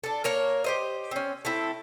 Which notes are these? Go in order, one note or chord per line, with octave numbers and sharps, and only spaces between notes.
D4 A4
A#3 A#4 C#5
G4 C5 D#5
C4 C#4
A3 C4 E4